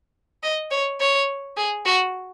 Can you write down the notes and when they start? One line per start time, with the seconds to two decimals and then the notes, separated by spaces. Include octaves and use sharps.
0.43 D#5
0.71 C#5
1.00 C#5
1.57 G#4
1.86 F#4